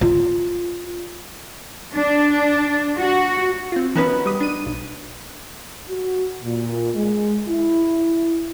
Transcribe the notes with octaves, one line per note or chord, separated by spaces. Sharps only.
F4
D4
F#4
C4 F4
E3 B3 C#4 D#4 F#4 B4
G3 D#6
D4 D#7
B1
F#4
A#2
G#3
E4